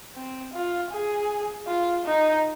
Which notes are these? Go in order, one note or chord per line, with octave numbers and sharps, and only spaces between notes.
C4
F4
G#4
F4
D#4